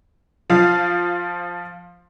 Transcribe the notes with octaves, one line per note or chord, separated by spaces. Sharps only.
F3 F5